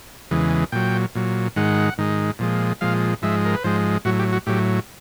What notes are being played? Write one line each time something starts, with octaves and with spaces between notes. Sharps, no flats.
E2 C#3 E3 G#3
A#2 F#3 G5
A#2 F#3
G#2 D#3 G#3 F#5
G#2 D#3 G#3
A#2 F3 G#3
A#2 F3 G#3 F5
G#2 F3 G#3 E5
A#4
B4
G#2 F3 G#3 C5
A2 F#3 F#4
G4
F#4
A2 F#3 G4